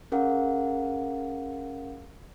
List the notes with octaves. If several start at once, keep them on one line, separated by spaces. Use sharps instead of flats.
C#4 G#4 A#4 F5 F#5